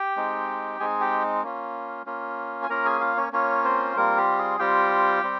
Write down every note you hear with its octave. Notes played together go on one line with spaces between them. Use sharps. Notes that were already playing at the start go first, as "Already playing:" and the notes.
Already playing: G4 G5
G#3 C4 D#4
G#3 C4 D#4 G#4 G#5
G4 G5
A#3 C#4 F4
A#3 C#4 F4
G#5
A#3 C#4 F4 A#4 A#5
G#4 G#5
F4 F5
C#4 C#5
A#3 C#4 F4 C#5
C4 C5
G3 A#3 C4 F4 A#4
G4
G#4
G3 C4 F4 G4 G5
G3 C4